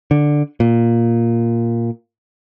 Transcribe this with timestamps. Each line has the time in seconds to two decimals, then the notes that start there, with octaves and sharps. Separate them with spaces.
0.11 D3
0.60 A#2